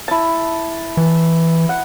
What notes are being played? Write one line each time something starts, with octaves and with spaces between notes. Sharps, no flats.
E4 A5
E3
F#5